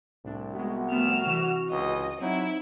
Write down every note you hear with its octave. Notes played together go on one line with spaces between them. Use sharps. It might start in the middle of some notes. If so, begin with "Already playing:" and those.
C2 A2 D4
G#3 B3 F#4
F3 A3 B3 F6 E7
C3 E3
C#2 D#5
F#3 C4 D#4 E4